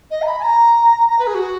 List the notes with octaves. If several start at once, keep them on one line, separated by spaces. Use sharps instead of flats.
D#5
A#5
B5
G#5
A#5
A#5
B4
G#4
F#4